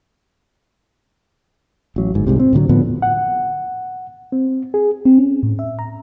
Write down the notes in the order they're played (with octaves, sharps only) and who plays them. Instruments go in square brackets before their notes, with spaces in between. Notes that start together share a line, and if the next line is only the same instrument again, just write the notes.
[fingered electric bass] A1 F#3
G1 G#2
C2 G#2 C3
C4
A2 D3 E3 F#3
A2 D3 F3 B3
[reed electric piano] F#5
C4
G#4
[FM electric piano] C4
C#4
A2
E5
A#5